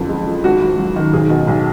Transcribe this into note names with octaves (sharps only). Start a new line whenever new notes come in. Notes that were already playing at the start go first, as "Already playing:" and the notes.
Already playing: F#1 F2 D3
G#3
F3
G#1 F#4
G#2
F#3
D#3
B1 G#4
B2
B1